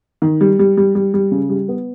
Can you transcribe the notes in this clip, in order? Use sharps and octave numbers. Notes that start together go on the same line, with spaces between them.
D#3
G3
G3
G3
G3
G3
C#3
G3
B3